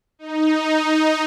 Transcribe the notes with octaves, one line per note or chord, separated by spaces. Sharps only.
D#4